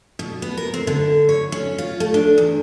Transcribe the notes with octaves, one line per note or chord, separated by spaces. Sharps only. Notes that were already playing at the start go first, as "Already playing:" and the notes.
B2
B3
A#4
C4
D3
C#5
C#4
F4
A3
D4
E2